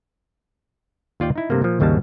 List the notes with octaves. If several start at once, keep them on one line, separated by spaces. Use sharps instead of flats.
D#2 F4 D5 G5
D#4 E4
G2 C3 A3 A#3
A#2 F3
G#1 D#2 C#3 G3 G#3 A5